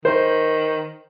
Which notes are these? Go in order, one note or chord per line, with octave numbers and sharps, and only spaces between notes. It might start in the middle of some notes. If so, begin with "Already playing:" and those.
D#3 C5